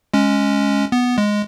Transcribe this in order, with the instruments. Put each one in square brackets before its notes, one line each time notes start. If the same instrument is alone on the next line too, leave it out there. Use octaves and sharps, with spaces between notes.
[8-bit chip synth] G#3 C#4
B3
G#3